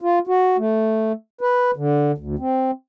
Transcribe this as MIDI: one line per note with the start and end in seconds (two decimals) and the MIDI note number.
0.01 0.19 65
0.27 0.57 66
0.58 1.12 57
1.41 1.71 71
1.76 2.12 50
2.18 2.36 38
2.39 2.71 60